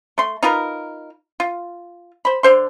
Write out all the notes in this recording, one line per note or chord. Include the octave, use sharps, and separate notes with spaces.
A3 C6
D#4 F4 A#4 B4
F4
C5 B5
D3 C5 C6